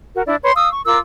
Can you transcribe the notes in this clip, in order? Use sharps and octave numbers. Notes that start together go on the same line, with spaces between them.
F#4 A#4
D4 E4 D5
B4 C#5 C6
F5 D#6 E6
C#6
F4 A#4 D6 E6